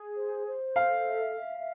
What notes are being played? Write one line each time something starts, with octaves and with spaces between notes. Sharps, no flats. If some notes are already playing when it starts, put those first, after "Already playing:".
Already playing: G#4
C5
C5
A4 F5
E5
E5